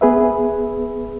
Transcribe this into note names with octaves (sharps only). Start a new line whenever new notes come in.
B3 G#4 B4 E5